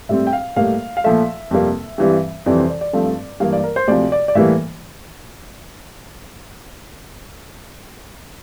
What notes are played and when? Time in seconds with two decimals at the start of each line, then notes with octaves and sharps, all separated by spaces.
0.09 A2 G3 C4 E5
0.27 G5
0.33 F5
0.56 A2 G3 A#3 F5
0.97 F5
1.04 A#2 F3 A3 E5
1.51 F2 C3 G3 A#3
1.98 G2 E3 G3 C4
2.46 F2 C3 E3 G3 D5
2.57 C5
2.69 D5
2.81 D5
2.93 G2 F3 A3 C4
3.40 G2 E3 A#3 F5
3.53 D5
3.64 A#4
3.76 C5
3.88 D2 C3 F3 D5
4.12 D5
4.28 D5
4.35 A2 E3 G3 A#3 E5